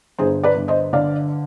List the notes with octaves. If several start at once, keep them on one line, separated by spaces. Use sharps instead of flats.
G1 G#4 C5
B4 D5
G1
C5 D#5
D3 D5 F5